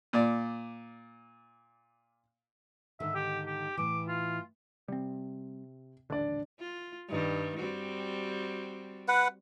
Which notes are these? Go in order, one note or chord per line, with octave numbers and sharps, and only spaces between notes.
A#2 D5
G#2 D3 D#3 E5
G4
G4
A2 E3 D6
F4
C3 G3 C4
D#1 A1 D3 D4 D5
F4
G2 D#3 G3
G3 C4 F#4
B4 F#5